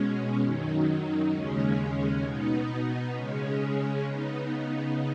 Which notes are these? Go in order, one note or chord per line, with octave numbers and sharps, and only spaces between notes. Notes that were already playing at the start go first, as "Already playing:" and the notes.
Already playing: B2 G#3 C#4
F#2 D#3 F#3 D#4
D#2 C#3 G#3 C#4
B2 B3 D#4
C#3 G#3 C#4
C#3 B3 D#4